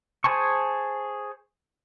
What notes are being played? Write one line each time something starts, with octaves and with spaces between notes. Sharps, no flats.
G#4 C5 G#5 A5 C#6